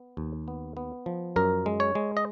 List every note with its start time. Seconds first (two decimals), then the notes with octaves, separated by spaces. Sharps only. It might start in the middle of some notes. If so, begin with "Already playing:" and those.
Already playing: B3
0.17 D#2
0.48 B3
0.77 B3
1.06 F3
1.36 F#2 A#4
1.66 G#3
1.80 C#5
1.95 G#3
2.17 D#5